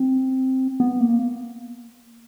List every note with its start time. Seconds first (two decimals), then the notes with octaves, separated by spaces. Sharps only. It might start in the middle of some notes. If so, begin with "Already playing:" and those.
Already playing: C4
0.80 B3
1.01 A#3